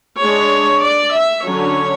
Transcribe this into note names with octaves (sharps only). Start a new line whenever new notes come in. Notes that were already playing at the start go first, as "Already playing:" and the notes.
G#3 D4 C#5
D5
E5
D3 F#3 C#4 C#5